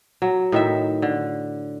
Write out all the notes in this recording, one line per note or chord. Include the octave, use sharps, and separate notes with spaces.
F#3
A2 D#3 E5
D3